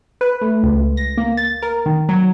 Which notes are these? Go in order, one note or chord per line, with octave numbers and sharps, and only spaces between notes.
B4
A3
C#2
A#6
A#3
A6
A#4
D#3
F#3